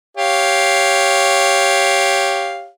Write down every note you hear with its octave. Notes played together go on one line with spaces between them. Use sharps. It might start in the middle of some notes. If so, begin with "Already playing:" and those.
G4 C#5 F5